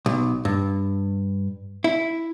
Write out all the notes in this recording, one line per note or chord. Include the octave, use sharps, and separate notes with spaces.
B1
G2
E4